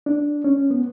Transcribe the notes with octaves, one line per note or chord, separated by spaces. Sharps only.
D4
C#4
B3